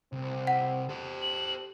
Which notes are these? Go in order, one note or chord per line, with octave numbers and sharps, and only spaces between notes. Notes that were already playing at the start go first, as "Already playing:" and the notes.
C2 C4
F#5
G4 A4 C5
F#7